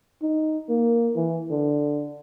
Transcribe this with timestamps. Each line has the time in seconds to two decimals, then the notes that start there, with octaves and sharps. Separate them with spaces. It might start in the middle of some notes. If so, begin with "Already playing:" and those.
0.22 D#4
0.69 A#3
1.15 E3
1.51 D3